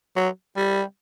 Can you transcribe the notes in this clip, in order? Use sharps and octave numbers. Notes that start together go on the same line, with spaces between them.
F#3
G3